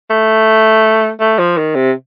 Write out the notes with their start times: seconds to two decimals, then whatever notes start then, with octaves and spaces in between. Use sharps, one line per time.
0.10 A3
1.20 A3
1.39 F3
1.58 D#3
1.75 C3